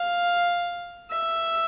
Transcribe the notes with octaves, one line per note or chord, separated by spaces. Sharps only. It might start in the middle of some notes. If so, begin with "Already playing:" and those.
Already playing: F5
E5